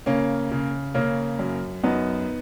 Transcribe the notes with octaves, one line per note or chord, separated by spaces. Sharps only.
C#3 A#3 C#4
C#3
C#3 A#3 C#4
F#2
F#2 B3 D#4